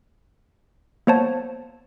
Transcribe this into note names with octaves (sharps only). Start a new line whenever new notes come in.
A#3 B3 C5 C#5 A5